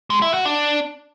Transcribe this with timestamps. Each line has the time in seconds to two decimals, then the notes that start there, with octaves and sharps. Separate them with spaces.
0.10 G#3
0.22 E4
0.34 F#4
0.45 D4